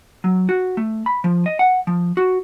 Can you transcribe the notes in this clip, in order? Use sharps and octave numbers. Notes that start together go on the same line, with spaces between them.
F#3
F#4
A3
B5
F3
D#5
F#5
F3
F#4